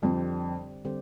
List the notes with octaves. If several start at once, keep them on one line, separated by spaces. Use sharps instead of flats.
F2 D3 G3 C4 G4 C5
D3 G3 C4 G4 C5